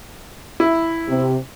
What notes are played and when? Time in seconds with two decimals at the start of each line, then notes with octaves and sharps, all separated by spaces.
0.60 E4
1.07 C3